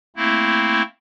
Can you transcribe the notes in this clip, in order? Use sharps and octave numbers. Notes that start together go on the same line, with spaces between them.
A3 A#3 C4 E4